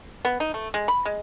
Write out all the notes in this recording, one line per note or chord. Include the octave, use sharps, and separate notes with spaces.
B3
D#4
A3
G#3
B5
G#3